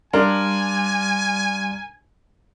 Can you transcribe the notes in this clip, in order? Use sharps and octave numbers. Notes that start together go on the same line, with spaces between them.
G3 D4 A#4 F5 G#5 C6